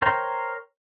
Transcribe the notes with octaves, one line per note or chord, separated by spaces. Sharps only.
A#4 C5 C#5 G5 A#5